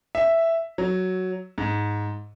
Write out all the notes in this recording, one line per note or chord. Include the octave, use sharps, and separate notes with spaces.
E5
F#3
G#2